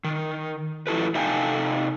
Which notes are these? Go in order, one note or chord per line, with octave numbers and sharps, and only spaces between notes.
D#3
F3 E4 A4 B4
C3 D#4 A4 F5 G5 G#5